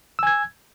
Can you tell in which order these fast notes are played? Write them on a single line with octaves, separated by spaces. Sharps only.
E6 G#5 G#6